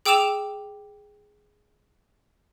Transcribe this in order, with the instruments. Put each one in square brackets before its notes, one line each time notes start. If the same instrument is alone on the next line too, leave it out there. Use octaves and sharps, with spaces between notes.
[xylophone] G#4 G5 D6 E6 E7 F7